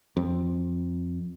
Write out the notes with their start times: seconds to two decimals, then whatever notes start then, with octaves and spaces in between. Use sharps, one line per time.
0.17 F2